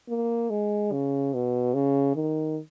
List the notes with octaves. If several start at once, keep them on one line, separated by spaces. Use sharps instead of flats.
A#3
G#3
C#3
B2
C#3
D#3